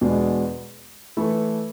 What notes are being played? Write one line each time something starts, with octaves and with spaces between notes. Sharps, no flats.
E2 B2 G#3 D4
E3 A3 E4 A4